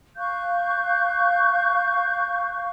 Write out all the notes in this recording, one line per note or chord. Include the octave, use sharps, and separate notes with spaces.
F5 C#6 F#6 G6